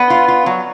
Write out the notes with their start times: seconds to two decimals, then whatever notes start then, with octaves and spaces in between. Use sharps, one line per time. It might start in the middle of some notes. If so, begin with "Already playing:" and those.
Already playing: B3 B4
0.10 F4
0.28 F4
0.46 F#3